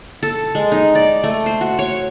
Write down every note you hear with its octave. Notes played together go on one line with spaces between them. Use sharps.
A4
G#3
D#4
D5
A3
C5
F#4
C#5